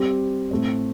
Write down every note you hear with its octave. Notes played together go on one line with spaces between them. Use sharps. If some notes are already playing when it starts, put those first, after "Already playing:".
Already playing: G3 C4 G4
A2 A3 C4